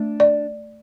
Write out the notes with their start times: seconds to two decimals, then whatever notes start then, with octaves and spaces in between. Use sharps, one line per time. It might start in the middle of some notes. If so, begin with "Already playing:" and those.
Already playing: A3 D4
0.20 D5